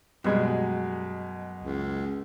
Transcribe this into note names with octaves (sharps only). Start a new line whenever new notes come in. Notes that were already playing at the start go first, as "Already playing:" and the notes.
F#2 B2 G3 G#3 G#4 G5
C#2